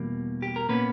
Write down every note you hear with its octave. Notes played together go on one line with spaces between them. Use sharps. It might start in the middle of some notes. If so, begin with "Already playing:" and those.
Already playing: E2 B2 G3 A#3
G4
A#4
A#2 A#3 B3 C#4 B4